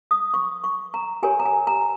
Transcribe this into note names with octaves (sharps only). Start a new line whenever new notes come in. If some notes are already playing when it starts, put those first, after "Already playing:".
D#6
C#6
C#6
A#5
G4 A#4 C#5 G#5
A#5
G#5
A#5